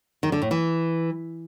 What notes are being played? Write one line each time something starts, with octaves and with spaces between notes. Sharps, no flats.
D#3
D3
A2
E3